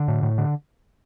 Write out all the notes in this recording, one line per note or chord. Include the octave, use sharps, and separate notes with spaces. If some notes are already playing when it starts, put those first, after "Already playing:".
Already playing: D3
A2
A2
D3